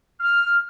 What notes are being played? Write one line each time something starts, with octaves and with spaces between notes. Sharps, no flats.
F6